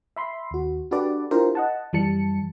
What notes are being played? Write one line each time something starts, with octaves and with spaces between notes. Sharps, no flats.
E5 B5 C6
D#2 F#4
D4 F#4 G4 A4 B4 D5
D4 E4 F4 G4 A#4 C5
D#5 F#5 A5
F#2 E3 G3 A5 C#7